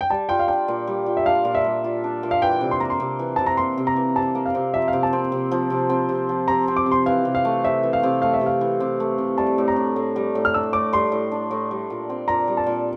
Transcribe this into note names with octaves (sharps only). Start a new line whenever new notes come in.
G5
G3 A5
F4 G5
F5
D4 G5
A#2
G3
F4
E5
D4 F5
A#2
E5
G3
F4
D4
A#2
F5
E3 G5
C3
C6
A#3 A#5
C6
C3
E3
C3 A5
A#5
A#3 C6
C3
A#5
E3
C3 A5
A#3
F5
C3
F3 E5
F5
C3
A5
C4
C3
F3
C3
C4
C3
F3
C3 A#5
C4
D6
C3
C6
E3 F5
C3
F5
A3
C3 E5
E3
F5
C3
A3 F5
E5
C3
F5
E3
C3
A3
C3
G3 A5
A2
A#5
D4
A2
G3
A2
F6
D4 E6
A2 D6
G3 C6
A2
D4
A2
G3
A#2
C4
A#2 A#5
G3
A5
A#2